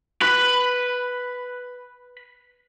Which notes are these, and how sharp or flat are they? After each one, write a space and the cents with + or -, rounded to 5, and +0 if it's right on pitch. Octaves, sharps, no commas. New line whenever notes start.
B4 +0 B5 +15